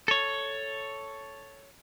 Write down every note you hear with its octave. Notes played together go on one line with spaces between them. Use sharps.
A4 C#5